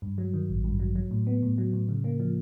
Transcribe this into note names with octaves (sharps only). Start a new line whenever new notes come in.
G2
F#3
D#3
A1
G2
F#3
F#3
A2
B3
A2
F#3
A2
C#3
A#3
F3